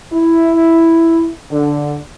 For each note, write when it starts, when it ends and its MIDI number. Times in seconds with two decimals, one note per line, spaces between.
0.13 1.29 64
1.51 1.96 50